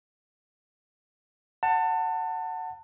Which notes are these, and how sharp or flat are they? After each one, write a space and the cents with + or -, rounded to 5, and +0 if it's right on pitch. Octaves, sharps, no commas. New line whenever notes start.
F#5 +0 A5 +25